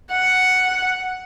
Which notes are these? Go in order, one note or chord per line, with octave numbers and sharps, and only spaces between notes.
F#5